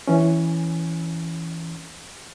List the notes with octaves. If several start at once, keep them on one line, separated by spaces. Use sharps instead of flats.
E3 C#4